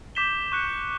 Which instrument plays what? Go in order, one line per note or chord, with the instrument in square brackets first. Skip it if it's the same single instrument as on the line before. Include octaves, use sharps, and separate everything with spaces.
[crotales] D6 G6 B6 E7 G7
C#6 F#6 C#7